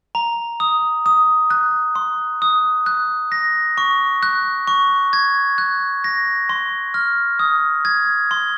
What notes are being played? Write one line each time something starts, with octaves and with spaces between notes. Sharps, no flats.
A#5
D#6
D#6
F#6
C6
D#6
F#6
A#6
C#6
F#6
C#6
G#6
F#6
A#6
C6
F6
D#6
G#6
C6